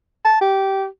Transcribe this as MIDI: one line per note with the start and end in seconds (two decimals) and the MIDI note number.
0.25 0.37 81
0.41 0.86 67